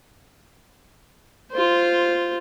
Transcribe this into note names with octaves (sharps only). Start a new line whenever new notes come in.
F4 C5